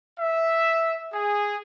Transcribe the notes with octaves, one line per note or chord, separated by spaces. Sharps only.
E5
G#4